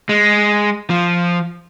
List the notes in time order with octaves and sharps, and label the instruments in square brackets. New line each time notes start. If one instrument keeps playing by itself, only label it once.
[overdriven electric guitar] G#3
F3